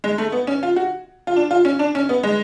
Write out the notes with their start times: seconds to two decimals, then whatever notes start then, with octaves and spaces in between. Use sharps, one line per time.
0.04 G#3
0.18 A3
0.32 B3
0.47 C#4
0.63 F4
0.76 F#4
1.27 F4
1.36 D4
1.51 F4
1.65 C#4
1.79 D4
1.95 C#4
2.09 B3
2.23 G#3